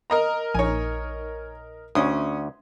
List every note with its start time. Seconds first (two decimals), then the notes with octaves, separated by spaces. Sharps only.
0.10 A#4 D#5 A#5
0.55 A#1 D#4 C#5 G#5
1.95 D2 C#4 C6 D#6